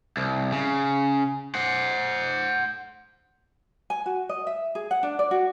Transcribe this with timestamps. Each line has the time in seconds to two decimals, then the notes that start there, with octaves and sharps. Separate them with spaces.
0.17 C2
0.52 C#3
1.55 C5 F#5
3.90 G#5
4.06 F#4
4.29 D#5
4.47 E5
4.75 G#4
4.91 F#5
5.03 D4
5.19 D5
5.31 F#4